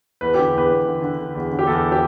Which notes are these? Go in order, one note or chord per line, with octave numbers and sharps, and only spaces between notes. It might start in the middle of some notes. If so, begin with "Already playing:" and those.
E2 B4
G4
D3
E2 B4
E2
D3
D3
D3
E2
D3
G4
E2 A4
G4